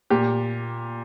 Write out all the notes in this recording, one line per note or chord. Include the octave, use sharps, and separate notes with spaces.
A#2 G4